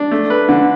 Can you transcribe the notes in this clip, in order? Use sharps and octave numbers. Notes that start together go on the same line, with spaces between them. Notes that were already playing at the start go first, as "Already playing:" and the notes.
Already playing: D4
A3
B4
D3